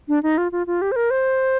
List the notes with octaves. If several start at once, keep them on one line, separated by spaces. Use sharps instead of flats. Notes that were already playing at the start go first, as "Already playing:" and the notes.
D4
D#4
F4
F4
F4
G4
C5
A#4
C5